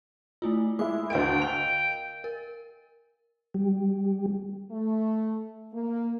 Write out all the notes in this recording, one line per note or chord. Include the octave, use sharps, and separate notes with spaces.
A3 E4 F4
G#3 E4 D6
D2 A#4 D#5 F5 G5 D7
F7
A#4
G3
A3
A#3